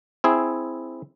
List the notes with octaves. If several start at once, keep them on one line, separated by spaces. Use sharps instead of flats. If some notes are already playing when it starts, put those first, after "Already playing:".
C4 E4 G#4